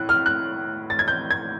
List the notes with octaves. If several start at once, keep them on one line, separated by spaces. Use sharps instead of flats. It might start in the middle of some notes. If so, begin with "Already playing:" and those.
Already playing: A2 F#6
F6
F#6
A6
G#6
G6
G#6